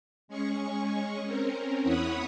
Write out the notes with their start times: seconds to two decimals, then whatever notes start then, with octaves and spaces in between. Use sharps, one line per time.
0.28 G#3 C#4 G#4 C#6
1.26 C4 C#4 A#4
1.83 E2 E4 C#5 F#5 B5 D#6